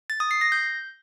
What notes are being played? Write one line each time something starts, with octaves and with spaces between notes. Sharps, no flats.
A6
D#6
C7
A#6
G6